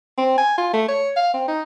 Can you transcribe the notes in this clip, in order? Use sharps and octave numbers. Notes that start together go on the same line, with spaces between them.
C4
G#5
F4
A3
C#5
F5
C4
D#4